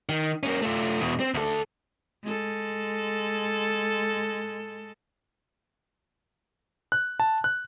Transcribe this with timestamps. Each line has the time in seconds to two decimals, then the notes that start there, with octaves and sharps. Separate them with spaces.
0.09 D#3
0.43 A#3 C#4
0.62 A3 F4
1.00 E2 B2
1.20 C4
1.34 D2 A4
2.24 G#3 A4
6.92 F#6
7.20 A5
7.44 F#6